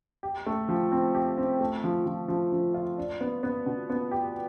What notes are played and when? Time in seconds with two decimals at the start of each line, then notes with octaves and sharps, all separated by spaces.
0.23 G4
0.46 A3
0.68 F3
0.92 C4
1.14 G4
1.37 C4
1.60 A3
1.84 F3
2.06 F3
2.28 F3
2.52 F3
2.74 F4
2.98 D4
3.21 B3
3.43 B3
3.66 B2
3.90 B3
4.11 G4